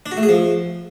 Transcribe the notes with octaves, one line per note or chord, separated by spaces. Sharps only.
D4
F#4
A3
G#4
F3